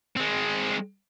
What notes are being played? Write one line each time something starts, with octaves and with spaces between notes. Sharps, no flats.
G#3 C4